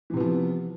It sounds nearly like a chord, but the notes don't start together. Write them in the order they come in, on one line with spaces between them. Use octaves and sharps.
E3 C3 B3 F3